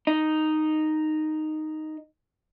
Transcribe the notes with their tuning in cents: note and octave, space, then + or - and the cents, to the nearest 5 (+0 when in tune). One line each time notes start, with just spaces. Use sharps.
D#4 -5